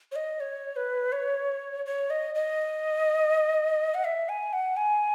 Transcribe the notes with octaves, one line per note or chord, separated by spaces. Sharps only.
C#5
D#5
C#5
B4
C#5
C#5
D#5
D#5
F#5
E5
G#5
F#5
G#5